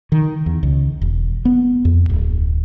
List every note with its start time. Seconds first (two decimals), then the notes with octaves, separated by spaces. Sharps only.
0.12 D#3
0.46 E2
0.63 C#2
1.02 E1
1.45 B3
1.85 F2
2.10 D1